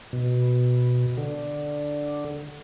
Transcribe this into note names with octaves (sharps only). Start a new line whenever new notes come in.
B2
D3